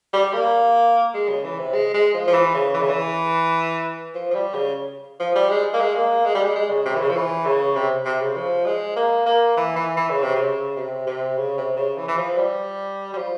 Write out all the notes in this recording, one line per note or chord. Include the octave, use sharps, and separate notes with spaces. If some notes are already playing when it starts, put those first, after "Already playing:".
G3
A#3
G#3
C#3
E3
C3
G#3
G#3
F3
F3
E3
C#3
E3
C#3
E3
F3
F3
G3
C#3
F3
G3
G#3
A#3
G#3
A#3
G#3
G3
G#3
G#3
C#3
C3
E3
C#3
F3
E3
C#3
C3
C3
C#3
F3
G#3
A#3
A#3
E3
E3
E3
C#3
C3
C#3
C3
C3
C#3
C3
C#3
E3
E3
F3
G3
G3
F3